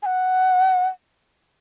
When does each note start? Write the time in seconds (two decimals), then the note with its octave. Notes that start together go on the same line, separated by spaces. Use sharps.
0.02 G#5
0.06 F#5